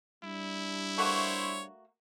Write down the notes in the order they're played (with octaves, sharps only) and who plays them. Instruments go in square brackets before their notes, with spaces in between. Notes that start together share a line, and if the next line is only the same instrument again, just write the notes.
[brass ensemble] G3 D4 [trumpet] E4
[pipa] A3 A#3 F#4 [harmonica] C5 C#5